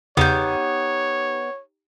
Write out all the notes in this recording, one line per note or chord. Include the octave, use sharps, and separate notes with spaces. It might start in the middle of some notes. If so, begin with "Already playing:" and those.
E2 C#3 B3 D#4 G4 C#5 G6